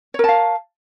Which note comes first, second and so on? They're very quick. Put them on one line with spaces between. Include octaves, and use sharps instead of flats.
C#5 A#4 A5 F5